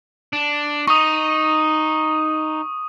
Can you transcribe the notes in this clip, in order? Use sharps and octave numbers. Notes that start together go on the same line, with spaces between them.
D4
D#4 C#6 D#6